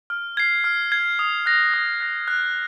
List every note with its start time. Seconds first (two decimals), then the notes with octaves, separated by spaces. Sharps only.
0.10 F6
0.37 G#6 C7
0.64 F6
0.92 G#6 C7
1.19 D#6
1.46 F#6 A#6
1.74 D#6
2.00 F#6 A#6
2.28 F#6